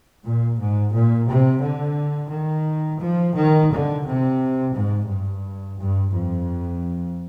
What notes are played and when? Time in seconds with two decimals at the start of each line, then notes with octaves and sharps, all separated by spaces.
0.24 A#2
0.59 G#2
0.93 A#2
1.28 C3
1.63 D3
2.32 D#3
3.01 F3
3.35 D#3
3.71 D3
4.05 C3
4.75 G#2
5.09 G2
5.78 G2
6.13 F2